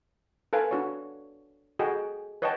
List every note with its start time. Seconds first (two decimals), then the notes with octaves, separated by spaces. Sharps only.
0.53 A4 B4 F5 G#5
0.71 D4 F#4 C#5
1.79 F#4 G#4 A4 D#5 G5
2.42 B4 C#5 D#5 F#5 G5 A5